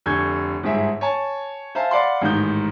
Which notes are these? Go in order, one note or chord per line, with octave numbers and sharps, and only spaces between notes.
F1 D3 G#5 C#6 G6 G#6
G1 G#2 G#4 E5
C#5 G#5 A5
C5 E5 F5 G#5 A5
D5 F5 F#5 B5 C6
A1 G#2 D#3 G6